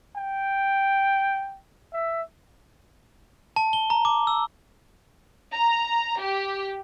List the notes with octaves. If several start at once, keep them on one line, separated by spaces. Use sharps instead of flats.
G5
E5
A5
G7
A#5
D6
E6
A#5
G4